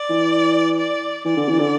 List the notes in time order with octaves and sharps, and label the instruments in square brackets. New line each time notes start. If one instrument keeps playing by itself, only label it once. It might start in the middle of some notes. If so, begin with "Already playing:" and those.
Already playing: [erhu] D5
[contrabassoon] E3
[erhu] D5
[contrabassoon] E3 [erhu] D5
[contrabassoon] D3
E3
D3